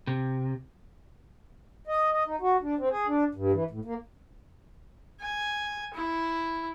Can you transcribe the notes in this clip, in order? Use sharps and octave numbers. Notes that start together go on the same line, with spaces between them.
C3
D#5
D#5
D#4
F#4
D4
C4
G#4
D4
G2
E3
A2
A#3
G#5
E4